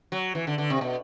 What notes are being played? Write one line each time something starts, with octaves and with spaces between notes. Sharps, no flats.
F#3
E3
D3
D3
C3
B2